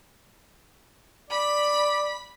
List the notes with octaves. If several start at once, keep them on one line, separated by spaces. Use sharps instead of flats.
D5 B5 B6